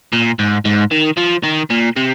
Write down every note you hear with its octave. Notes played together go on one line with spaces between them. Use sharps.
A#2
G#2
G#2
D#3
F3
D#3
A#2
C3